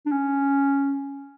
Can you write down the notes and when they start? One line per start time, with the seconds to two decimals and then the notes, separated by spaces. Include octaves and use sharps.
0.06 D4
0.12 C#4